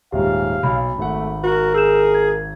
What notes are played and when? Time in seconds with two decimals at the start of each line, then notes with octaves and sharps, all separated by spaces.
0.12 D#1 G#2 G4 E5 F5
0.63 B1 B5
0.98 G#1 A3 F#5
1.44 F#4 A#4
1.74 G#4 E6 G6 E7
2.14 G#6